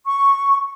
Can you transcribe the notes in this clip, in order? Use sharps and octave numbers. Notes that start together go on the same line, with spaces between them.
C#6